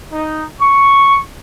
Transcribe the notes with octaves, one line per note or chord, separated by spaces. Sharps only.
D#4
C#6